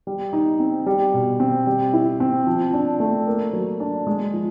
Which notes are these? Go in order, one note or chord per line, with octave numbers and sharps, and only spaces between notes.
G3
D#4
C4
G3
B2
C4
G3
E4
C4
F3
D4
A3
A#3
F#3
D4
G#3
F3